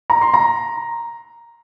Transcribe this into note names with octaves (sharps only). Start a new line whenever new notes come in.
A#5
C6
A#5